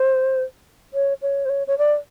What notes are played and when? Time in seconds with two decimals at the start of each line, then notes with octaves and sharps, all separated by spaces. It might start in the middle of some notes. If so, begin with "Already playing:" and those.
Already playing: C5
0.94 C#5
1.22 C#5
1.45 C5
1.49 C#5
1.67 C#5
1.78 D5